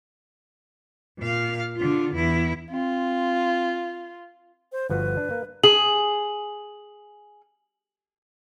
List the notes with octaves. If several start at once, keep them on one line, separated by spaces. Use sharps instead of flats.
A#2 F5
D3 F4
E2 E4
C4 F4
C5
G1 F3 F#4 B4
D4
A#3
G#4 F#7